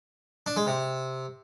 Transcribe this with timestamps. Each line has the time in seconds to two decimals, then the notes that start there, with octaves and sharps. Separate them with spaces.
0.46 D4
0.57 G#3
0.67 C3